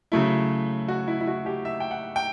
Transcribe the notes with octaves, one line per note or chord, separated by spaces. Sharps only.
C#3 F#3 A3 E4
F#4
E4
E4
F#4
G4
E5
G5
F#5
G5